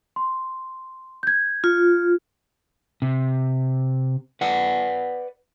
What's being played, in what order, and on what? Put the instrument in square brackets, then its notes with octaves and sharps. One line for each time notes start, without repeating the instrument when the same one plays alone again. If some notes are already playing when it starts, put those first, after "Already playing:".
[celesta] C6
G6 G#6
[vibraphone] F4
[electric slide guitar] C3
B4 D5 F#5